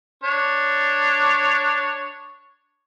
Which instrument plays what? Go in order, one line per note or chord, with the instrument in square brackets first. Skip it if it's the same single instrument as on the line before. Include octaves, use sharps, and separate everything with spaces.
[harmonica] D4 C#5